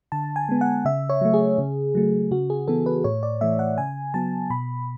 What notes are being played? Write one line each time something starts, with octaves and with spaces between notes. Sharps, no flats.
D3 A5
G#5
G#3 B3
F#5
C#3 E5
C#5
F#3 A3
G#4
C#3
F#3 A3
C#3 F#4
G#4
E3 B3 A4
B4
A2 C#5
D5
E3 A3 E5
F#5
C#3 G#5
F#3 B3 A5
B2 B5